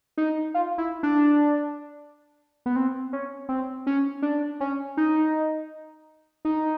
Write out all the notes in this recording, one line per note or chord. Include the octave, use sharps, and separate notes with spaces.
D#4
F4
E4
D4
B3
C4
C#4
C4
C#4
D4
C#4
D#4
D#4